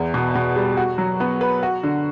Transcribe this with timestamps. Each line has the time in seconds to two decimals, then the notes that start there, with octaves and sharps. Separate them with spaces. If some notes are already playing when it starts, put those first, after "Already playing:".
Already playing: E2
0.14 B2
0.35 B2
0.56 G3
0.77 F#4
0.98 F#3
1.20 B3
1.41 B4
1.63 F#4
1.83 D3